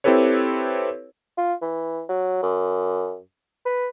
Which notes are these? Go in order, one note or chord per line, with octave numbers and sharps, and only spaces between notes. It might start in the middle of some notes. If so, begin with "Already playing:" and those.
C4 E4 G4 A4 B4 C#5
F4
E3
F#3
F#2
B4